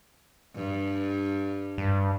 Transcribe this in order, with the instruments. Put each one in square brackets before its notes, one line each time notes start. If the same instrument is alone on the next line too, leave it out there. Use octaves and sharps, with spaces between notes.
[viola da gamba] G2
[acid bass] G2